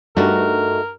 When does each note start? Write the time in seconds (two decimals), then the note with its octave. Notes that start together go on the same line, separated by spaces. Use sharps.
0.17 G2 A3 D#4 F#4 A#4